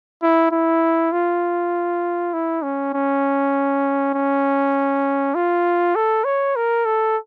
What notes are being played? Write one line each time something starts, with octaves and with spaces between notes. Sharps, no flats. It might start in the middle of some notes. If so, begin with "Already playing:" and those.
E4
E4
F4
E4
C#4
C#4
C#4
F4
A4
C#5
A#4
A4